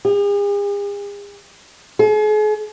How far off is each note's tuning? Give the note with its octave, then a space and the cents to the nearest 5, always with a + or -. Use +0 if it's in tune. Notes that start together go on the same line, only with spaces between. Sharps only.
G#4 -45
G#4 +40